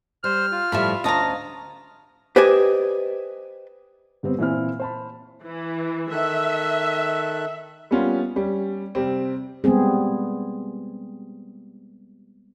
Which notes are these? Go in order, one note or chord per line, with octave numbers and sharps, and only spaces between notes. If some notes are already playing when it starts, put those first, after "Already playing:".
G3 C5 F6
F4
A2 F3 G3 E5 B5
D2 C#4 D#5 F5 A5 A#5
G4 B4 C5 D5 D#5 G#5
G1 G3 B3 C4
A#2 E3 C4 E4 G#5 F6
C5 A5 B5
E3
D#3 A4 E5 F#6
G3 A#3 B3 C#4 F4
G3 C#4
C3 G3 C4
G3 G#3 B3 C4 G#4